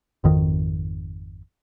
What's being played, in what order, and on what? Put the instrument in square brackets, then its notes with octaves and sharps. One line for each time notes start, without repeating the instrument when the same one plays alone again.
[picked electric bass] G#1 F2 D#3